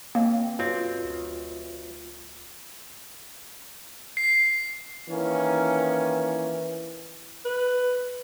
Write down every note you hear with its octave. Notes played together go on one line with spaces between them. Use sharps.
C#2 A#3 C4
B1 F#2 C4 F4
D2
C7
D#3 E3 A#3 C#4
B4